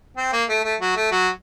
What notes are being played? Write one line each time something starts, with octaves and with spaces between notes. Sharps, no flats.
C4
A#3
A3
A3
F#3
A3
F#3